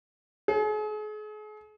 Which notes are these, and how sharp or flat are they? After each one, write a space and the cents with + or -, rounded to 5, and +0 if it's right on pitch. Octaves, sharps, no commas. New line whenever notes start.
G#4 +40